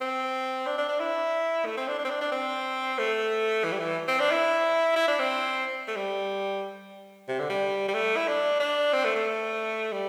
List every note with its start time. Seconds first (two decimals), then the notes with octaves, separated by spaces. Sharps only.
0.01 C4
0.67 D4
0.78 D4
0.89 D4
1.00 E4
1.66 A3
1.77 C4
1.88 D4
1.98 D4
2.05 C4
2.10 D4
2.21 D4
2.32 C4
2.98 A3
3.64 E3
3.72 G3
3.79 E3
4.08 C4
4.20 D4
4.31 E4
4.96 E4
5.08 D4
5.19 C4
5.88 A3
5.96 G3
7.28 C3
7.39 D3
7.50 G3
7.88 G3
7.94 A3
8.16 E4
8.28 D4
8.60 D4
8.93 C4
9.05 A3
9.16 A3
9.92 G3